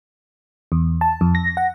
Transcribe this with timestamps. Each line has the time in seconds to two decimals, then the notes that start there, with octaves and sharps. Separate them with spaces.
0.72 E2
1.01 A5
1.21 F2
1.35 A#6
1.57 F#5